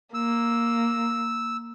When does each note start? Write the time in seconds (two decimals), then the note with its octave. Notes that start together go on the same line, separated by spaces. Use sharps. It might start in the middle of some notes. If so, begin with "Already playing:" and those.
0.14 A#3 E6